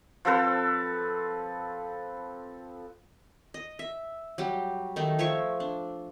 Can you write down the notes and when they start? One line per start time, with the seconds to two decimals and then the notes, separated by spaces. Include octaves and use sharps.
0.25 F3 C4 A4 B4
3.54 D#5
3.79 E5
4.38 F#3 G3 G4
4.96 D#3 A3 D#4
5.19 F3 C#5 E5 C#6
5.60 D4